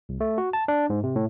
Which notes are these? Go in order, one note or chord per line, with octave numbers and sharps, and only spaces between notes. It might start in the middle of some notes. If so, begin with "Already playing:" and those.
C2
A3
F#4
A5
D4
G#2
C3
A2